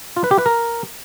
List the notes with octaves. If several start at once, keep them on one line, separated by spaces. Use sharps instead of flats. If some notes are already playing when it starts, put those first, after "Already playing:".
F4
B4
G4
B4
A#4